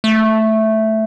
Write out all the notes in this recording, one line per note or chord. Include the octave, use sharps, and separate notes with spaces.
A3